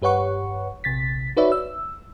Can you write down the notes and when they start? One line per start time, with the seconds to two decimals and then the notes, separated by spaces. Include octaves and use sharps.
0.02 G2 G4 B4 C#5 F#5 C#6
0.84 A#1 C3 A6 B6
1.37 D#4 F#4 B4 C#5 D5 E5
1.52 E6